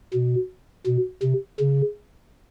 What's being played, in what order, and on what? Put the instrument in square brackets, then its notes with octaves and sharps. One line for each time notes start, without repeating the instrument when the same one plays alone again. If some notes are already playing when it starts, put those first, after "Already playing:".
[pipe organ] B2
B2
C3
C#3